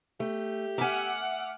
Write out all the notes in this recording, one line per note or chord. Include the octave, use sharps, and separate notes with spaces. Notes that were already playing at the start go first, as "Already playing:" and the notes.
A3 G4
E5 F#5 G#5 A#5 D6 F6